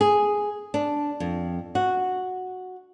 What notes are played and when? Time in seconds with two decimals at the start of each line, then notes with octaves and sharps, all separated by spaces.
0.01 G#4
0.74 D4
1.20 F2
1.75 F#4